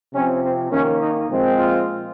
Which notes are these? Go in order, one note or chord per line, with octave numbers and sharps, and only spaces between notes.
C3 F3 C4 C#4
C4
D#3 A#3 C#4
D#4
A#2 F3 G#3 C4
F4